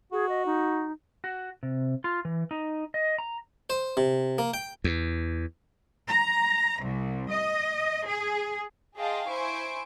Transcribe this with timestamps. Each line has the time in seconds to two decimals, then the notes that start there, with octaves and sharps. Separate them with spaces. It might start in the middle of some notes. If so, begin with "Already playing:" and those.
0.12 F#4 G#4
0.29 D#5
0.46 D#4
1.24 F#4
1.63 C3
2.04 F4
2.25 E3
2.51 D#4
2.94 D#5
3.18 A#5
3.70 C5
3.97 C3
4.38 A#3
4.54 G5
4.84 E2
6.08 A#5
6.83 C2
7.31 D#5
8.07 G#4
8.97 G#4 D#5 F5 G5 A5 C6
9.27 E4 C5 G#5 C#6 D7